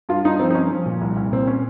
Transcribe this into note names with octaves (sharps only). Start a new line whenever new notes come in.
G2 F4
G2 D#4
F3 C4
D#4
G2 C#4
F3
A#2
C2
C2
A#2 C4
C#4